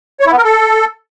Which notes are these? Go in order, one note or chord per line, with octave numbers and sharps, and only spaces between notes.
C#5
E4
B3
A#4
A4